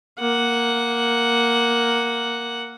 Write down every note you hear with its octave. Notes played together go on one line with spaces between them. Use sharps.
A#3 F#5